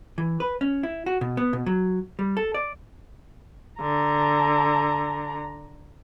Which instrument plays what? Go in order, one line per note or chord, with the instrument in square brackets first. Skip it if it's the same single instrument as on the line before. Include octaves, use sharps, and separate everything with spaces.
[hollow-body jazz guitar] E3
B4
C#4
E4
F#4
B2
B3
B2
F#3
G3
A4
D5
[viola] D3 A#5